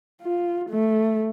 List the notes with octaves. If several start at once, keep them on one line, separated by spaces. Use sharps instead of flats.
F4
A3